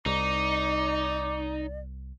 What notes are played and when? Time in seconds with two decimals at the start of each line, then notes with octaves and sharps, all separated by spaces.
0.06 C2 D#4 D5 D6